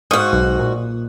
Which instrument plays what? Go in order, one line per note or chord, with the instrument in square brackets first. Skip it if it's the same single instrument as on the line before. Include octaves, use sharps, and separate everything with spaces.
[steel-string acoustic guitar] G#2 F#4 [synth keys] F5 C#6 D#6
[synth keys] B1
A#2